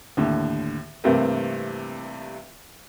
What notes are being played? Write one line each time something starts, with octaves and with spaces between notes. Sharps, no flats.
D#2 A2 D3
G2 C3 E3 A3 A#3 C4